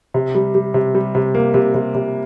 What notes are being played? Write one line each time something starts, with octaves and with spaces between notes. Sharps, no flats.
C3
G3
G3
C3
G3
C3
A#3
C3
C3
C3